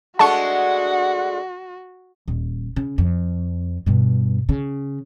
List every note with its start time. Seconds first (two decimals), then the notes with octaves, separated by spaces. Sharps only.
0.19 G#3 A3 D4 F#4 F#5 A5 C#6
2.28 D#1
2.76 C#3
2.98 F2
3.86 G2 B2
4.49 C#3